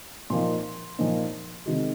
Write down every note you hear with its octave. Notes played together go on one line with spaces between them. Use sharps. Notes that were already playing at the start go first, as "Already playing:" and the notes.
A#2 F3 A#3 D#4 C6
A#2 F3 A#3 D#4
C3 D#3 G#3